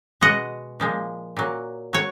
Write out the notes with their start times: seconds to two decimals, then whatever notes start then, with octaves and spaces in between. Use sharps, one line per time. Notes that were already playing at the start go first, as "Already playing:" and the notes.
0.21 B2 G#3 D#5 F#5
0.80 A#2 F3 G#3
1.37 A#2 F#3
1.93 F#3 C#5